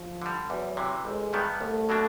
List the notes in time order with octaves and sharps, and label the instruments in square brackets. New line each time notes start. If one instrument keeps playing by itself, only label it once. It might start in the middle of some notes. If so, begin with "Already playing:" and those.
Already playing: [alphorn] F3
[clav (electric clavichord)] D3 G3
[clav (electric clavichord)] E2 [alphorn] F#3
[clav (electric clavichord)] C3 E3
[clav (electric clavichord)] A1 [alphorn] G#3
[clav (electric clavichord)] G2 D#3 G3 B3
[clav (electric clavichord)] C2 [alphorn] A3
[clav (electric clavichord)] B2 F#3 A#3 D4